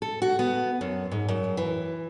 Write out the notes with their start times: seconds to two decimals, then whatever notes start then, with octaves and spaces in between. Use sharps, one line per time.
0.02 A4
0.22 F#4
0.39 B3
0.81 F#2
1.11 G#2
1.28 F#2
1.57 E3